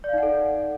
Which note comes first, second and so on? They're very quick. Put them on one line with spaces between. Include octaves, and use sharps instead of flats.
D5 F5 D#4 F#5 A4